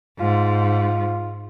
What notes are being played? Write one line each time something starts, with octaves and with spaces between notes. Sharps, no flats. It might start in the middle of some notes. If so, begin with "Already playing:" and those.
G#2 F4